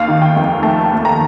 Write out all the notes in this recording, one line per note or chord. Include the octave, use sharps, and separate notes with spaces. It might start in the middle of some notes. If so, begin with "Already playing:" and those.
Already playing: D#2 F5
D#3
G5
F1
A3 A5
D#2
A#5